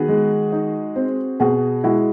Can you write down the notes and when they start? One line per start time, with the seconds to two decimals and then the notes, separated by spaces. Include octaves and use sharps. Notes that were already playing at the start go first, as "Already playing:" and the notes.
Already playing: D#3 B3 F#4 G#4
0.08 G#3
0.52 D#4
0.96 C4
1.40 B2 F#4 G#4
1.84 G#3 E4 F#4